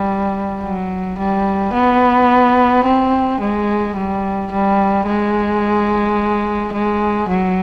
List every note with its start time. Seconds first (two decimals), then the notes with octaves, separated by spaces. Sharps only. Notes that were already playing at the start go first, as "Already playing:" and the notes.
Already playing: G3
0.62 F#3
1.18 G3
1.73 B3
2.85 C4
3.41 G#3
3.96 G3
4.52 G3
5.07 G#3
6.73 G#3
7.29 F#3